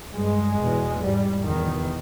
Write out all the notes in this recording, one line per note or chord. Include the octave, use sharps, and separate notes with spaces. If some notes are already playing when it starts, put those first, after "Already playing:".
G2 G#3
E2 B2
G#2 G3
E2 D#3
B2